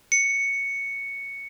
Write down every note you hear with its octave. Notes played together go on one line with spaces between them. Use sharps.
C#7